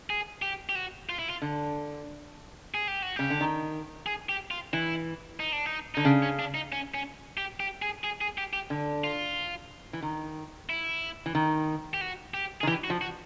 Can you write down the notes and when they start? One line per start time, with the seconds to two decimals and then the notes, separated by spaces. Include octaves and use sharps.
0.10 G#4
0.42 G4
0.69 G4
0.75 F#4
1.09 F4
1.19 E4
1.30 F4
1.42 D3
2.74 G#4
2.88 G4
3.02 F#4
3.16 C#3 G4
3.30 D3
3.41 D#3
4.06 G#4
4.29 G4
4.51 F4
4.73 E3 E4
5.40 D#4
5.52 D4
5.66 D#4
5.95 D3 D#4
6.05 C#3 D4
6.23 C#4
6.39 D4
6.55 D#4
6.72 C#4
6.94 C#4
7.37 G4
7.60 G4
7.82 G#4
8.04 G#4
8.21 G#4
8.38 G4
8.53 G4
8.70 D3
9.04 F4
9.93 E3
10.02 D#3
10.69 E4
11.26 E3
11.35 D#3
11.94 G4
12.01 F#4
12.34 G4
12.61 D#3 G#4
12.67 E3 G4
12.84 F#4
12.90 F3
13.01 F#4